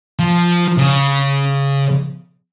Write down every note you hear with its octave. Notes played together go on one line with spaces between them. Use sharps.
F3
C#3